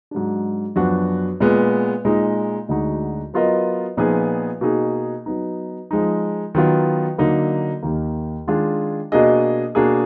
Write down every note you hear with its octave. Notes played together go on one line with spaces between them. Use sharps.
G#2 F#3 D4
F#2 F3 B3 D4 F#4
A#2 G#3 B3
A#2 G#3 D#4
D2 D3 G#3 D#4 F#4
F#3 B3 F4 A#4 D#5
A#2 F3 B3 D#4 G#4
B2 A#3 D#4 G#4
F#3 B3 D#4
F3 G#3 D#4
D#3 F#3 B3 F4
D3 F#3 A#3 D#4
D#2 D#3 A#3
D#3 G#3 D4 F4 G#4
B2 A#3 D4 G#4 D#5
B2 A#3 D4 G#4